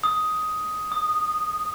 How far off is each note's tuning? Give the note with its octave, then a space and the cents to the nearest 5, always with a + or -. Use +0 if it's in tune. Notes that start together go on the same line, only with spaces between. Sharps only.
D#6 +5
D#6 -15